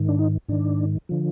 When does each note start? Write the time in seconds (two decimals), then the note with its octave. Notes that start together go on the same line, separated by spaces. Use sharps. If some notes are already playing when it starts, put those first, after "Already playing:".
Already playing: G#2 D#3
0.09 D4
0.19 D#4
0.48 G#2 D#3 D4
1.09 D3 F3